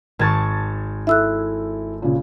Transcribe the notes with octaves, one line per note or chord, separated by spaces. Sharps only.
G#1 A5 C#6 G#6 A6
E4 A4 E5 E6 F#6
A#2 C#3